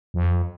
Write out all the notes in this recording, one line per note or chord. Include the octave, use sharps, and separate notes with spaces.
F2